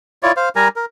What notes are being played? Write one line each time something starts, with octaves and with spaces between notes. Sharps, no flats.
E4 F4 C#5 D5
C5 F5
G3 A#4 G#5 A#5
A#4